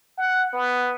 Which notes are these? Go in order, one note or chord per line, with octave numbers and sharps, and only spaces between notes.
F#5
B3